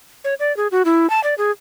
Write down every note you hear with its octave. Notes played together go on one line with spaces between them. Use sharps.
C#5
D5
G#4
F#4
E4
A5
D5
G#4